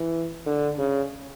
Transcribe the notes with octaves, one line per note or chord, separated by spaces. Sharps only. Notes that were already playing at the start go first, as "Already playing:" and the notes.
Already playing: E3
D3
C#3